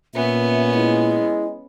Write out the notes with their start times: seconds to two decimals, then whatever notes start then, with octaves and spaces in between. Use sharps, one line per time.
0.15 A#2 B3 C#4 E5
0.74 G#3 E4